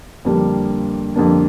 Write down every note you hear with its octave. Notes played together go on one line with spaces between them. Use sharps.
F2 D3 G3 A#3 D4
F2 D3 G3 A#3 D4